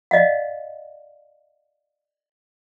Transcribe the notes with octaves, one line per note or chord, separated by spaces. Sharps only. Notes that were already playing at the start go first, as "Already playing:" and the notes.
D5 D#5 F5 F#5